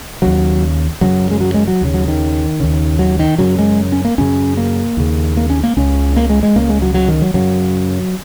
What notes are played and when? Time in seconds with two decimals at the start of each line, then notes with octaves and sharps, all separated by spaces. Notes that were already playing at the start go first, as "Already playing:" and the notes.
0.22 D#2 C#3 F#3
1.01 F#2 C#3 F#3
1.31 G#3
1.41 F#3
1.54 G#3
1.68 F#3
1.81 D#2 C#3
1.94 F#3
2.08 D#3
2.60 D#2 C#3
2.99 F#3
3.19 D#3
3.38 F#2 C#3 F#3
3.58 G#3
3.92 C#4
4.05 A#3
4.18 F#2 C#3 C#4
4.57 A#3
4.97 D#2 C#3
5.37 A#3
5.50 C#4
5.64 A#3
5.77 C#2 C#3 C#4
6.16 A#3
6.30 G#3
6.43 G#3
6.55 C#2 C#3 A#3
6.69 G#3
6.82 F#3
6.94 F#3
7.08 D#3
7.22 F#3
7.34 F#2 C#3 F#3